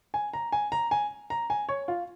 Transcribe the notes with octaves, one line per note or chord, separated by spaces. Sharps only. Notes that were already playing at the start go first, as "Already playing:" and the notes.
G#5
A#5
G#5
A#5
G#5
A#5
G#5
C#5
F4